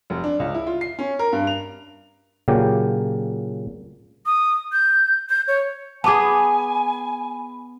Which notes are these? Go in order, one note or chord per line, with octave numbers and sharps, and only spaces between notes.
F1
D4
C#2
E4
F4
C7
C#4
A#4
G2
F7
A#2 C#3 F#3 G4
D#6
G6
G6
C#5
B3 G#4 G#5 A5 B5 D6